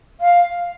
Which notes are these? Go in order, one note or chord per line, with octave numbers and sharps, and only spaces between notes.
F5